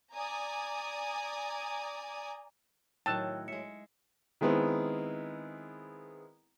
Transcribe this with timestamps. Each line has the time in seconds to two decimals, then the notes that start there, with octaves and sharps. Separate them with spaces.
0.13 D5 G#5 A#5 D#6
3.06 A2 D#3 F#3 G5 A5 E6 F#6
3.48 G#3 E5 C#7
4.41 D#3 G#3 B3 C4 E4